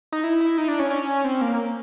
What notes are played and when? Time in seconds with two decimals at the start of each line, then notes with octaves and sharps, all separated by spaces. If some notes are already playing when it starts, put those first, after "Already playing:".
0.12 D#4
0.24 E4
0.41 E4
0.58 D#4
0.68 D4
0.79 C#4
0.90 C#4
1.24 C4
1.41 A#3